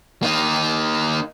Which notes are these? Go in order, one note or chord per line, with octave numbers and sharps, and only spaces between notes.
A#3 D#4